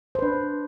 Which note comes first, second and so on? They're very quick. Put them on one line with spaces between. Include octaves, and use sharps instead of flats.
C5 B4 D4